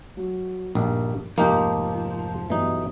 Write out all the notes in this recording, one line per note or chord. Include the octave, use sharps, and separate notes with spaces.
F#3
A#1 G2 D#3
F1 G#2 F3 A#3 D#4 G4
B1 G2 B2 E3 D#4